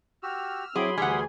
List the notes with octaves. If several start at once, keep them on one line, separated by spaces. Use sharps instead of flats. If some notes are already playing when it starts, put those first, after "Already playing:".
F#4 G4 E6 F6
F#3 C4 E4 G#4 B5 C6 D6
D2 E3 G3 G#4 F#5 G#5